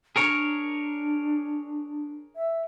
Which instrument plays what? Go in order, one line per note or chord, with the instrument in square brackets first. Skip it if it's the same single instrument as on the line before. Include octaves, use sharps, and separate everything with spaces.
[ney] D4 [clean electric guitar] G#4 A#4 C#5
[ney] E5